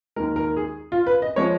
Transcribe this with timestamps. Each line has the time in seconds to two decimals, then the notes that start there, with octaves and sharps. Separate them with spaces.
0.16 D#2 D#3 G#3 A#4
0.36 A#4
0.56 G#4
0.92 F4
1.06 B4
1.22 D#5
1.36 F3 G#3 C#5